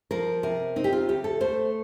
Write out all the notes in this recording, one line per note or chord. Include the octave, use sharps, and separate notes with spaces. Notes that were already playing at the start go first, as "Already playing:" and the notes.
F3 A#4
C3 A#4
C4 D#4
G4
F4
D2 G4
A4
A3 C5